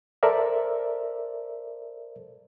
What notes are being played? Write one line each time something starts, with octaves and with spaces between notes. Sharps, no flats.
A4 A#4 C5 D5 E5